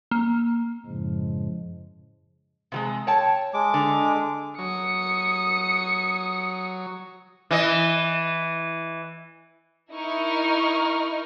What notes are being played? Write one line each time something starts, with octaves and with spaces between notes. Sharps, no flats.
A#3
F#2 A2 C#3 F3 G#3
C3 G3 G#3
C#5 G5 A5
G#3 D6
D3
F#3 D#6 C#7
E3 D#5
D#4 E4 A#4 D#5 C#6 F6